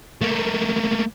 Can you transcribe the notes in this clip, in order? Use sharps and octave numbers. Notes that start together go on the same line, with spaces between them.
A3 A#3